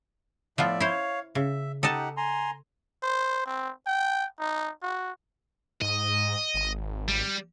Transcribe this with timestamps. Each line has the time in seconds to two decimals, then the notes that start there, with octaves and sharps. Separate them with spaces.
0.58 A2 F3 B3 F4 D5 E5
0.80 E4 C5 C#5 F5
1.35 C#3 E5
1.83 D#4 G4 A4 D#5 F#5 A5
2.17 G#5 A#5 C6
3.03 C5
3.46 C4
3.86 G5
4.39 D#4
4.82 F#4
5.82 G#2 D#5
6.54 G#1
7.08 G3